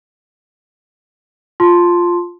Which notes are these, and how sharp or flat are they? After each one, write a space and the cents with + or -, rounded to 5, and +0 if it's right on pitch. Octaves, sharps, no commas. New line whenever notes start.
F4 +0 A5 +0 C6 +0